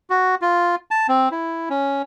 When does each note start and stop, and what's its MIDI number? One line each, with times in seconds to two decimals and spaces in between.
0.10 0.35 66
0.41 0.75 65
0.91 1.07 81
1.08 1.29 60
1.31 1.69 64
1.70 2.02 61